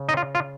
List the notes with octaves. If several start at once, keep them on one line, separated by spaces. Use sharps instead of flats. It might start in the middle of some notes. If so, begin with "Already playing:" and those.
Already playing: C#3
D#4 D#5
F4
F4